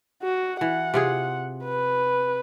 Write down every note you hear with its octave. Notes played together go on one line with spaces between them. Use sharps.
F#4
E3 F#5
C3 F4 G#4
B4